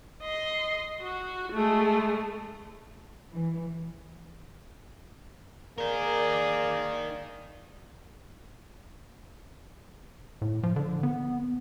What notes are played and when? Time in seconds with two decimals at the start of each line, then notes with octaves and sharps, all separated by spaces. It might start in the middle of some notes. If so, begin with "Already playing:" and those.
0.22 D#5 C6
1.00 F#4
1.52 G#3 A3
3.33 E3
5.78 A#3 D#4 G#4 A#4 D5
10.42 A2
10.63 F3
10.76 D3
11.03 B3